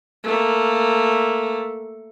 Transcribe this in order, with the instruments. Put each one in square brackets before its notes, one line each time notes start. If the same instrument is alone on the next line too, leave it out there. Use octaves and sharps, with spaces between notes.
[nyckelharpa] A3 A#3